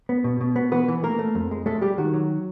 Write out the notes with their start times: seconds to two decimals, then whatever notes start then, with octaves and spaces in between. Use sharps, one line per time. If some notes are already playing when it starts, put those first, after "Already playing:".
0.09 B3
0.24 B2
0.41 B2
0.56 B3
0.72 E3 B3 B4
0.88 E3
1.03 A3 A#3 A#4
1.19 A3
1.35 F2
1.51 G#3
1.66 G#3 A3 A4
1.81 G3 G#3 G4
1.98 D#3 F#4
2.14 F#3